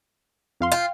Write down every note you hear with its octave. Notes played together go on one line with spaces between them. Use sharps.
F2 F5 C6
F4 F5 G5